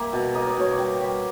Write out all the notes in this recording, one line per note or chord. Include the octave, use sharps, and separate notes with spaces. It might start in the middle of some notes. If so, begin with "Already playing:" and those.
Already playing: G3 A#3 E5
B2
A#3 D#5
D5
B2 C#5
D5
G3
G3